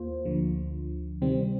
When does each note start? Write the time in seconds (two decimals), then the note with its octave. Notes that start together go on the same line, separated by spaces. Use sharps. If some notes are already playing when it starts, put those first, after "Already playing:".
Already playing: D#2 A#3 F4 C5
0.25 D2 D3 F3
1.22 C3 D#3 G3 C4